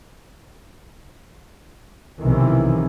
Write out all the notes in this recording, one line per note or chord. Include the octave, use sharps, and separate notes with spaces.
B1 C3 D#3 E3